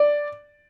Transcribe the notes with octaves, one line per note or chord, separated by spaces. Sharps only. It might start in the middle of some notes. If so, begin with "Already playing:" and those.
Already playing: D5